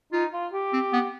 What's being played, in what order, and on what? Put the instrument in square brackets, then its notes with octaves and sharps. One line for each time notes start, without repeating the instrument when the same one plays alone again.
[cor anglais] D#4 [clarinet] F4
[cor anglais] F4
G4
[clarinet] C4
B3